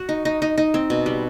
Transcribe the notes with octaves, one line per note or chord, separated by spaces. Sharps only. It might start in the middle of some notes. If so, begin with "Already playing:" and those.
Already playing: F#4
D#4
D#4
D#4
D#4
C4
B2
G3